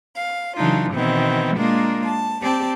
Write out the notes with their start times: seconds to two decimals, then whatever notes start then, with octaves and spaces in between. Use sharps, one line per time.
0.14 F5
0.56 C#3 E3 F#3 D4 D#4 F4
0.92 B2 D#3 E3 B3 C4 E4
1.56 G#3 A#3 D4 F4 A#4
2.04 A5
2.42 C4 G4 D5 A5